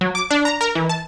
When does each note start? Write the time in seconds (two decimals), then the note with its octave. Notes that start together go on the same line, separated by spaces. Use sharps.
0.01 F#3
0.15 D6
0.31 D4
0.45 A#5
0.61 A#4
0.75 E3
0.89 A5